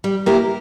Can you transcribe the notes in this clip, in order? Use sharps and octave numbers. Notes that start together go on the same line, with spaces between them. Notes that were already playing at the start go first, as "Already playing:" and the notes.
G3
A#3 E4 G4 A#4